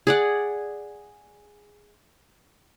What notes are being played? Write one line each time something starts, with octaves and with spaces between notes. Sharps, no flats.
G#4 D5 F#5